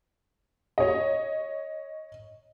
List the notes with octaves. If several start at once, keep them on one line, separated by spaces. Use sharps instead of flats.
C#5 D#5